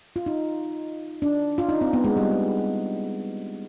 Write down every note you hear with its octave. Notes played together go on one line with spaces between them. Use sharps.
F4
D#4
D4
F4
D#4
C4
B3
G#3
G3